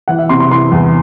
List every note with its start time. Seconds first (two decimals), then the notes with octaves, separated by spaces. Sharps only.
0.08 E3 F#5
0.19 E5
0.29 C3 C6
0.40 C6
0.50 E3 C6
0.72 E2